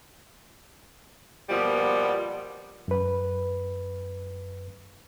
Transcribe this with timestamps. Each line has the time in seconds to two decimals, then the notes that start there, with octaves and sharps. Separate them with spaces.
1.50 B2 F3 G3 A#3 B3
2.88 F#2 B4